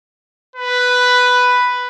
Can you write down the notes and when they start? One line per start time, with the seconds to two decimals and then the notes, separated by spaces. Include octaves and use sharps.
0.56 B4